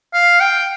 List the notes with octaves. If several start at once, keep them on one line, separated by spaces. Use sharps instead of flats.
F5
G5